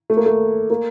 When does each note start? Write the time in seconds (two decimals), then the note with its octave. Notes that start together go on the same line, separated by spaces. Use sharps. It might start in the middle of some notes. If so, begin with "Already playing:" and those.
0.10 A3
0.17 A#3
0.26 A3
0.70 A#3